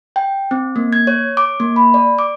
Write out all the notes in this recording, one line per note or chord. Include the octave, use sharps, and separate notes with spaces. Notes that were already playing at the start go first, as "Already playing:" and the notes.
G5
C4
A#3
G#6
C#5
D6
A#3
B5
D5
D6